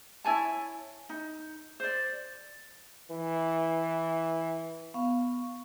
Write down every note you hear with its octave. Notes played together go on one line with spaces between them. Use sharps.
E4 C#5 G#5 A5
D#4
C5 D5
E3
B3 F5 C#6